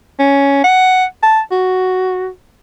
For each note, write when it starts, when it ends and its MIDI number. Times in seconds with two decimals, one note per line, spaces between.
0.19 0.60 61
0.64 1.05 78
1.23 1.40 81
1.51 2.29 66